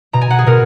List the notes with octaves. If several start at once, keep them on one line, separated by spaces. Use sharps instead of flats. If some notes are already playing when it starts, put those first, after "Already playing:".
B2 A#5
G#5
F#5
G#4
B2 A#4